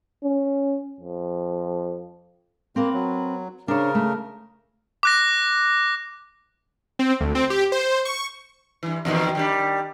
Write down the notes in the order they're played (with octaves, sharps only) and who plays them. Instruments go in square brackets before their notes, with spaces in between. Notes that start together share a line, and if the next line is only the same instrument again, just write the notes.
[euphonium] C#4
F2
[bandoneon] A#3 [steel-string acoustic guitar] C4 A#4 B4
[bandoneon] F#3
[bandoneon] C#3 A#4 [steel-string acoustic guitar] D4 C5 C#5
[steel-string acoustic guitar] A3
[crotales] D6 F#6 A#6
[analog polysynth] C4
D2
C4
G4
C5
C#6
[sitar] G2 E3
E2 B2 D#3
D#3 G3 D4